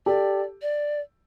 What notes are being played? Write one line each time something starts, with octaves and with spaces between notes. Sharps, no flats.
G4 A4 D5
D5